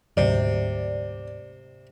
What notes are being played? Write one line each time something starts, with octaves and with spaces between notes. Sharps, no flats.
D2 G#2 C3 F#3 D5